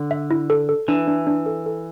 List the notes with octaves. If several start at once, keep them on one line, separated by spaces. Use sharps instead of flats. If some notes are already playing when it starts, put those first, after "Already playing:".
Already playing: D3
E5
E4
A4
A4
E3 D4
D4
D4
A4
A4